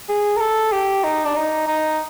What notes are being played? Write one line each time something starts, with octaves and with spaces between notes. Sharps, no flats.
G#4
A#4
A4
G4
D#4
D4
D#4
D#4